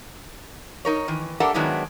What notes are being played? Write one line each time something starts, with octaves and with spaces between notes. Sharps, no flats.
D#4 A#4 C#5
D#3 E3
D4 G4 A4 A#4 E5 F#5
D#3 F#3 G#3 B3 D4 E4